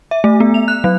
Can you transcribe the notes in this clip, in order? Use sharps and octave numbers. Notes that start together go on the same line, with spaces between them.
E5
A3
B3
F7
F#6
F#3